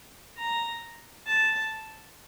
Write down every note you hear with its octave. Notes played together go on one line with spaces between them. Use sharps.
A#5
A5